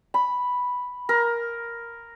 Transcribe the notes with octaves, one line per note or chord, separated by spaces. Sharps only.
B5
A#4